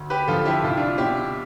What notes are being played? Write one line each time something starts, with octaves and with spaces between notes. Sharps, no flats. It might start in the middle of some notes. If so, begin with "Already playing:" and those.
Already playing: D2
G4 B4
D3 F3 F4 A4
A4
E4 G4
C2 F4
E4
D4 F4
B2 E4 G4